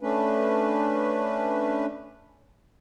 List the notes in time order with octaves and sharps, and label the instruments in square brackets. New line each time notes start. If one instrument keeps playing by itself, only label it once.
[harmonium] A3 C#4 D4 B4